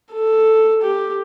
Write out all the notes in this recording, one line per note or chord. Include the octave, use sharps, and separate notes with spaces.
A4
G4